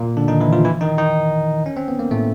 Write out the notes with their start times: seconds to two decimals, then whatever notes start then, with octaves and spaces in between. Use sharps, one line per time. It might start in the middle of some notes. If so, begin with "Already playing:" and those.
Already playing: A#2 A#3
0.17 D3 D4
0.28 D#3 D#4
0.40 E3 E4
0.53 F3 F4
0.65 E3 E4
0.81 D#3 D#4
0.97 D#3 D#4
1.66 C#4
1.77 C4
1.88 B3
1.99 A#3
2.11 A2 A3